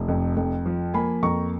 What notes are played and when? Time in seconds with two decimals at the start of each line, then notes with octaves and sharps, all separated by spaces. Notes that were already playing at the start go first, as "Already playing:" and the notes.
Already playing: F1
0.08 F2
0.37 F2
0.66 F3
0.94 A#3 G#5 B5
1.22 F2 A#5 C#6